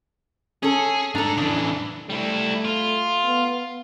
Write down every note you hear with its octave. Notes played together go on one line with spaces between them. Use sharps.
C#4 G#4 A4
G#2 D4 A4 A#5
C#3 E3 D4
G3 A3 E4
F4
B3